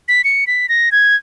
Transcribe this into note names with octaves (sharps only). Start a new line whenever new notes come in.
B6
C#7
B6
A#6
G#6